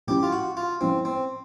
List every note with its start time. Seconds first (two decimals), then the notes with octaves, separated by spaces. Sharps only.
0.07 A2 F3 G#3 C#4 E4 G4
0.23 F4
0.32 F#4
0.57 F4
0.81 A2 F3 G#3 C4 C#4 E4
1.05 C4